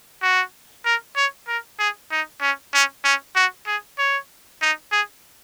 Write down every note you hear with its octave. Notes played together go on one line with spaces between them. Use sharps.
F#4
A#4
C#5
A#4
G#4
D#4
C#4
C#4
C#4
F#4
G#4
C#5
D#4
G#4